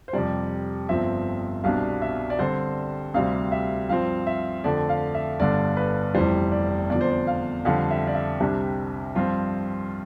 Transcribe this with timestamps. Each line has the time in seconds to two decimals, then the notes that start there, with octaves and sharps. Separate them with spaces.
0.08 C5
0.13 F2 C3 G3 D5
0.89 G1 G2 F3 C4 E5
1.64 C2 B2 G3 D4 F5
2.02 E5
2.30 D5
2.39 G2 D3 G3 C4 C5
3.14 D2 C3 G3 C4 F5
3.52 E5
3.89 G2 F3 C4 F5
4.27 E5
4.64 F2 D3 A3 D5
4.89 F5
5.15 E5
5.40 G1 G2 D3 D5
5.77 B4
6.14 F1 F2 E3 G3 C5
6.52 D5
6.90 E2 D3 F3 D5
7.01 C5
7.10 D5
7.27 F5
7.65 F2 D3 G3 F5
7.91 E5
8.07 D5
8.15 E5
8.40 C2 C3 G3 D4
9.16 G2 F3 C4 F4